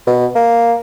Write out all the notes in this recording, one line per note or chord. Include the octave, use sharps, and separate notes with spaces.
B2
A#3